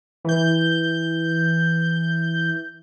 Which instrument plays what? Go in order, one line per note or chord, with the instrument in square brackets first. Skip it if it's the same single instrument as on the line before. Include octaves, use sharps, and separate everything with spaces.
[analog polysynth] E3 G6